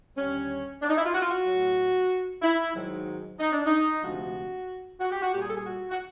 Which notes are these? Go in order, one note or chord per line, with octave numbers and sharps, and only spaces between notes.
D#2 D3 G3 C#4
D4
D#4
E4
F4
F#4
F4
F#4
A2 F#3
E4
G#2 D#3 F#3
D#4
D4
D#4
D2 C3 F3 G#3 F#4
F#4
G4
F#4
A#2 G3 G4 G#4
A4
G#4
F#4
F#4